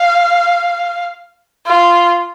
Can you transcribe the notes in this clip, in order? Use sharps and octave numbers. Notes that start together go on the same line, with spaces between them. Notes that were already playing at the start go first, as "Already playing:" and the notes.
Already playing: F5
F4